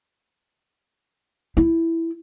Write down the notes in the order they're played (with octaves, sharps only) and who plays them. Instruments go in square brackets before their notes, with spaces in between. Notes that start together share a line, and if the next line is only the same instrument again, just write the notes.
[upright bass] E4